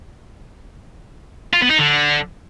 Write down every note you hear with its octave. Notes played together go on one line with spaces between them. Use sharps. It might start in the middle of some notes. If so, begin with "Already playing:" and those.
F4
B3
D#4
D3